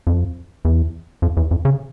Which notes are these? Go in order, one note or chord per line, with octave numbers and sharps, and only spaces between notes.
F2
E2
F2
E2
F2
C#3